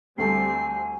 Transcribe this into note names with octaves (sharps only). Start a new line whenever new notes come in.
D2 G3 A3 C4 G#5 A5 C7